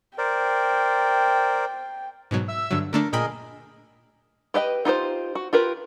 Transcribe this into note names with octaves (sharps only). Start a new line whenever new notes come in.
A#4 C5 D5 G5
G#2 B2 F#3
E5 E6
G2 D3 F#3
D3 A3 D4 A#4
A#2 G#4 A#4 D#5 G5 B5
G4 B4 D#5 G5
D#4 F4 G4 C5
F#4
F4 G4 A#4 B4